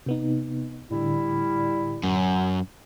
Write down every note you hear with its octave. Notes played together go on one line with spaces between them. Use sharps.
C3 B3 D#4
A2 D3 G3 E4
F#2